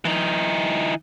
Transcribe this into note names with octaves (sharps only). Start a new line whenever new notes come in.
E3 D#4